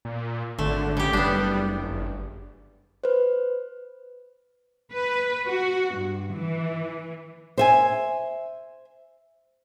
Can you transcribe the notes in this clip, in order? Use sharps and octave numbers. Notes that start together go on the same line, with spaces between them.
A#2
G#1 D3 A3
C#3 G4
F#1 G3 B3 D4
G1
B4 C5
B4
F#4
G2
E3
C5 E5 G#5